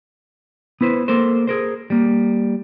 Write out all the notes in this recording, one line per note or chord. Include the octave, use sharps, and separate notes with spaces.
B3 E4 B4 C5
A#3 A4 A#4 C5
G#4 A#4 C5
G3 A#3